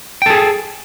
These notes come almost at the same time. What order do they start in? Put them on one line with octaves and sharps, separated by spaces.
G5 A4 G#4